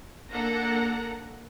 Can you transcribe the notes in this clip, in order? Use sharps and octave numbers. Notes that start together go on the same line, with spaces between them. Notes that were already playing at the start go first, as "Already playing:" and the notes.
A#3 D4 A4 F#5 A#5